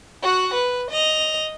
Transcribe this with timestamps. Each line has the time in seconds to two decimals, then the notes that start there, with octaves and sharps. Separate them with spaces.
0.22 F#4 F#5
0.54 B4
0.91 D#5 F7